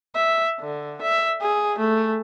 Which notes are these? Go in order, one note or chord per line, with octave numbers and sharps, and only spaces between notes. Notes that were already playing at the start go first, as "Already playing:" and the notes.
E5
D3
E5
G#4
A3